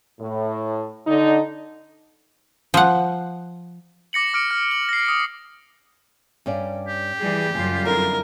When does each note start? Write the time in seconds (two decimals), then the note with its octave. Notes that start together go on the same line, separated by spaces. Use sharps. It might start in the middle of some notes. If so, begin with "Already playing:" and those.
0.20 A2
1.07 D3 D#4
2.74 F3 F#5
4.13 D6 A#6 C#7 F#7
4.33 D6 F6 C#7 D7
4.51 F6
4.71 F#7
4.89 A#6 C7
5.08 D#6
6.46 G2 C#4 D5
6.88 G4
7.18 E3 G3 G#4
7.54 F#2 C#3 G3 F4
7.85 F2 D3 E4 A#4